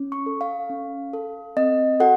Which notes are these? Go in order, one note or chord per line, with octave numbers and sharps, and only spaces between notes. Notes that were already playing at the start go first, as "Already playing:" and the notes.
Already playing: C#4
C#6
A4
F5
C#4
A4
C4 D#5
F#4 A4 F#5